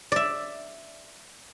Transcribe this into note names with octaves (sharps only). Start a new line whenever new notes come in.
D5 E5